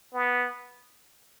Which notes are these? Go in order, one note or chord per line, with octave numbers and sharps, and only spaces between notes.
B3